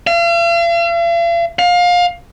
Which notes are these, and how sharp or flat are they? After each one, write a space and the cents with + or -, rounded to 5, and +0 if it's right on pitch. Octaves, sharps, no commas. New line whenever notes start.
F5 -45
F5 +25